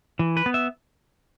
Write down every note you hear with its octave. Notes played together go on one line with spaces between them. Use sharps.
E3
B4
B3
E5